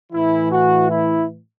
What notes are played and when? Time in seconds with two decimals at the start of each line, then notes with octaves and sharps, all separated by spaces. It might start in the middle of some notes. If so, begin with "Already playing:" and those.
0.12 A2 E3 E4
0.52 F#4
0.90 E4